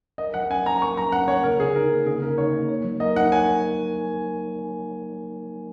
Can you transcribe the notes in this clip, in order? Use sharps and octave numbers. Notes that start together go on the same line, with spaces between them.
A#4 D#5
F#3 F#5
C#4 G#5
A#3 A#5
A#4 C#6
F#3 A#5
C#4 F#5
A#3 C#5
C#3 A#4
C#3 G#4
D#4 A#4
A#3
C#3 G#4
C#3 A#4
D#4 C#5
A#3
C#5
F#3
A#4 D#5
D#4 F#5
C#5 G#5